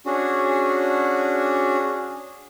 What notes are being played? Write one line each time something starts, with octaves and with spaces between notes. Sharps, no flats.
C#4 D4 F#4 G#4